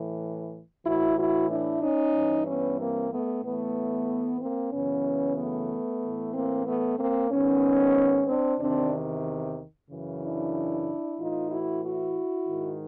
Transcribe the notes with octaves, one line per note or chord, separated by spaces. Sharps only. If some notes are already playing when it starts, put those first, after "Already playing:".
Already playing: A2 E3
A2 E3 E4 F#4
E4 F#4
D4 E4
C#4 D#4
G2 E3
B3 C#4
A#3 C4
A3 B3
A2 E3 A3 B3
A#3 C4
F#2 C#3 E3 B3 C#4
A3 B3
A2 E3
A#3 C4
A3 B3
A#3 C4
G#2 D#3 B3 C#4
C4 D4
E2 C3 D#3 C4 D4
F#2 C#3 E3
D4 E4
A2 E3 D#4 F4
E4 F#4
E4 F#4
G#2 D#3